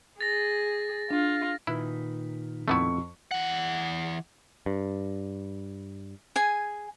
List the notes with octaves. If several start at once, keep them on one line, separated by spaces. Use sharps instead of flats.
G#4 A6 A#6
D4 F4
A#2 D#3 E4 B4
F2 A3 B3 E4 C#6
E3 F#5
G2
G#4 G#5